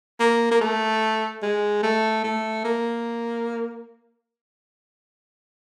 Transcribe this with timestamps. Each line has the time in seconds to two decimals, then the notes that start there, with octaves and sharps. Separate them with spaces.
0.20 A#3
0.51 A#3
0.61 A3
1.42 G#3
1.83 A3
2.24 A3
2.64 A#3